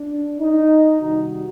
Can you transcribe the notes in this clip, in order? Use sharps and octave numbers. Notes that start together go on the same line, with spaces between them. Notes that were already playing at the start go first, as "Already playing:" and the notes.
Already playing: D4
D#4
C3 D#3 G3 F#4